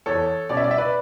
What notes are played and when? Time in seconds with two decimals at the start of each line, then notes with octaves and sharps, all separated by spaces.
0.06 E2 A4 C#5
0.49 B2 G3 C#4 D5
0.57 E5
0.64 D5
0.71 E5
0.78 B4 D5